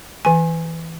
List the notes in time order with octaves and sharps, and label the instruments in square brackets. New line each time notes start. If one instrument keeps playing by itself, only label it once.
[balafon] E3 G#5